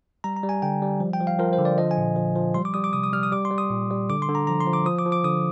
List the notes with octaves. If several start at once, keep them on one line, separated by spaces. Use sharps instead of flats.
G3 A#5
A#5
G3
G#5
D3 G5
G3
F3
G5
F3
F5
F3 A#4
C5
D3
D5
F3 D#5
G#5
A#2
F3
F3
G3 C6
D6
G3 D#6
D6
C3 D#6
D#6
G3 F6
D#6
G3 D6
C6
G3
D#6
A#2
G3
D3 D6
C6
D3
A#5
F3 A#5
C6
F3
D6
F3 D#6
D6
F3
D6
D3 D#6